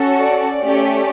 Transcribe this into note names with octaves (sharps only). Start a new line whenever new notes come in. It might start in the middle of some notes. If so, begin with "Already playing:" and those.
Already playing: C#4 F#4 A4
D5
A3 C#4 G4